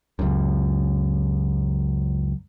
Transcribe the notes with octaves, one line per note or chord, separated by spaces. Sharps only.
C#2 F#2